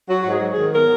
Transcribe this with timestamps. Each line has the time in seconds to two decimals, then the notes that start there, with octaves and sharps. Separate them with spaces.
0.09 F#3 F#4
0.22 G#2 F#4
0.31 G#4
0.42 F#3
0.52 G#4
0.58 D#3
0.73 B3 A#4